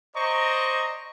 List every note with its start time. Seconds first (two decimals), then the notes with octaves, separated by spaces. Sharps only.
0.15 C5 D5 D#5 A#5 C#6